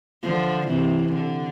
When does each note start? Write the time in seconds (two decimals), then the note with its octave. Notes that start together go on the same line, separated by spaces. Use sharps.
0.23 D3 F3
0.68 C3 E3
1.13 D3